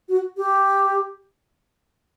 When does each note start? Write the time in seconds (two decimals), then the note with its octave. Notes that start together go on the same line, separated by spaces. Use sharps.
0.09 F#4
0.37 G4